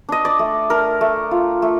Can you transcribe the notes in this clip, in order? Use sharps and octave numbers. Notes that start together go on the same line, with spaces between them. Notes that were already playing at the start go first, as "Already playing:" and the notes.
D4 D#5
D5
A3
D4 A#4
A3
F4
A3